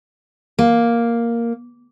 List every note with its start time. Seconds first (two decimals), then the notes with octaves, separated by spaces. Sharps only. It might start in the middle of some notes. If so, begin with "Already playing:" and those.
0.59 A#3